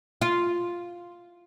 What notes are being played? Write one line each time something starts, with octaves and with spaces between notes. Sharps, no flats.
F4